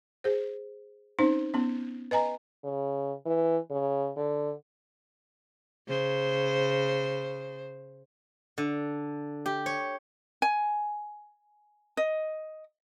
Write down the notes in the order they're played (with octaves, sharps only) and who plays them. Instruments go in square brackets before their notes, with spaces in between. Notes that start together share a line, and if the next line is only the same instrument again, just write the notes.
[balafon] G#4 C5
C4 C#4 D#4 C5
B3 C#4
B4 D#5 G#5 A#5
[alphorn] C#3
E3
C#3
D3
[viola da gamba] C#3 C5
[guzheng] D3
G4
C#5
[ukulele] G#5
D#5